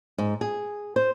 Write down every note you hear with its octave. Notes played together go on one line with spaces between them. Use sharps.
G#2
G#4
C5